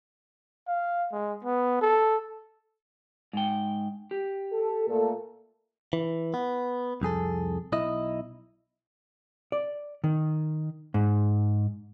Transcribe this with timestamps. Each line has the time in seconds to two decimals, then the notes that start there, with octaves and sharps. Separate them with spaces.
0.67 F5
1.12 G#3
1.44 B3
1.81 A4
3.33 G#2 G5
4.11 G4
4.53 A4
4.87 A#2 A3 A4
5.93 E3
6.34 B3
7.02 C2 F2 G#4 A4
7.72 B1 E4 D#5
9.52 D5
10.04 D#3
10.94 G#2